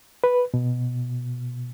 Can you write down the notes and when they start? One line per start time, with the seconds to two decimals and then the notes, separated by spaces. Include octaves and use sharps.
0.24 B4
0.54 B2